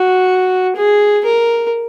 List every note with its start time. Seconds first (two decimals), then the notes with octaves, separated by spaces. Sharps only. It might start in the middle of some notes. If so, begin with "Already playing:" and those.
Already playing: F#4
0.76 G#4
1.25 A#4